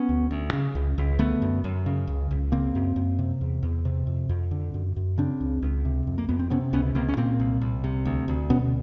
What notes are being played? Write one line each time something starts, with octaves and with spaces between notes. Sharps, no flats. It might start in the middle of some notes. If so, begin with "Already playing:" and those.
Already playing: B3 C#4
D2
D2
C#3
C#2
C#2
D3 A3 B3
F#2
F#2
C#3
C#2
C#2
C#3 A#3 C4
F#2
F#2
C3
E2
E2
C3
F2
F2
D3
F#2
F#2
C#3 C4 D4
C#2
C#2
C3
F2
A#3
F2 B3
C4
C3 B3 C#4
C#2 B3 C#4
C#2 A#3 C4
C#4
A#2 A#3 C4
C2
C2
C3
D2
D2
B2 B3 C#4